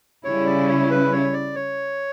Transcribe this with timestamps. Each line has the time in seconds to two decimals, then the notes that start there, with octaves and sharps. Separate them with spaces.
0.25 C#3 G3 C#4 E4 C#5
0.46 D5
0.68 C#5
0.90 B4
1.12 C#5
1.33 D5
1.55 C#5